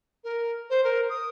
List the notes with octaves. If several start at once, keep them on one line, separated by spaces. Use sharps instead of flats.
A#4
C5
A#4
D#6